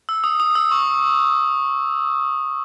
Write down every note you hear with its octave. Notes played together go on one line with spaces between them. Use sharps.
E6
D#6
D#6
E6
C#6